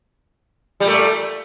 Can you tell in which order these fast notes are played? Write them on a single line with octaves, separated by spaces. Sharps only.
G3 A#2 A3